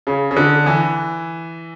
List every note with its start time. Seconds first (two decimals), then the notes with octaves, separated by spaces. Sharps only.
0.07 C#3
0.31 C#3
0.36 D3
0.66 E3